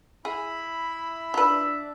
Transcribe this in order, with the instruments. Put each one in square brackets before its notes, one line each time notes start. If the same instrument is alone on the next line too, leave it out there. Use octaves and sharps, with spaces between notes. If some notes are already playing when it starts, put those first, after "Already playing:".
[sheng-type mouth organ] E4 B5 [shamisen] G#4
[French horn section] D4 [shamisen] F4 B4 [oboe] E5